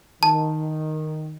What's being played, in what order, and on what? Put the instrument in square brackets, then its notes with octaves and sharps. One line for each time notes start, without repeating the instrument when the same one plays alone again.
[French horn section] D#3 [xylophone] A5